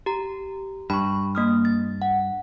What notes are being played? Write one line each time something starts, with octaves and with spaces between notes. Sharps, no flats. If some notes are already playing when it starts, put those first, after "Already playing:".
G4 A#5
G2 B5 C#6
A#3 D#6 F6
A6
F#5